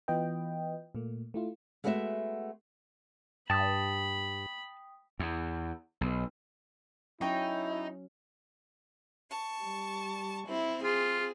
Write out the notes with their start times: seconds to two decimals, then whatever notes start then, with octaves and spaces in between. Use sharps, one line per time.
0.08 E3 B3 F4 B4 D#5 G5
0.95 A#2 A3 A#3
1.34 A3 E4 F4
1.84 G#3 A3 B3 F#4 D#5 E5
3.50 G2 G5 A5 B5 D#6
5.20 E2
6.01 B1
7.21 F#3 C#4 D#4 E4 C#5 G5
9.30 A5 C#6
9.62 G3
10.47 C4 E4
10.84 F4 G#4